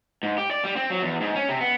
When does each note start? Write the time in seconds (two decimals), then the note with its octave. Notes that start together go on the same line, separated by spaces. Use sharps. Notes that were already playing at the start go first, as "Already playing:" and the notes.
0.23 G#2
0.38 G4
0.51 D5
0.65 G3
0.76 C4
0.90 F#3
1.02 E2
1.21 G#2
1.35 C#4
1.49 C3
1.61 B3